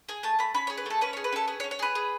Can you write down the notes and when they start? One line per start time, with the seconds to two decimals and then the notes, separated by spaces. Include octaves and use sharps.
0.09 G#4 G#5
0.23 A3 A5
0.39 A3 B5
0.54 C#4 B5
0.67 G#4 C#5
0.78 B4
0.86 A3 A4
1.01 C#4 B4
1.13 G#4 C#5
1.24 B4
1.32 C#4 A4
1.48 G#4 B4
1.60 C#5
1.64 C#4
1.71 C#5
1.79 G#4 B4
1.95 G#4